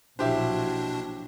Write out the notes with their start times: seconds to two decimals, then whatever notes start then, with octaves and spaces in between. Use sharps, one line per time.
0.19 A#1 B2 F#3 D4 E4 G4 C5